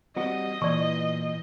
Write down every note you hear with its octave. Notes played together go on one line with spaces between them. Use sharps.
G3 C4 F#4 D#5
A#2 E3 D5 C#6